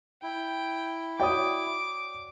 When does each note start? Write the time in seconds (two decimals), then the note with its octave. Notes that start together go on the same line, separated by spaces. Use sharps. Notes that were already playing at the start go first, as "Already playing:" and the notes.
0.23 E4 G5
1.20 F#4 C#5 D5 G5 D6 D#6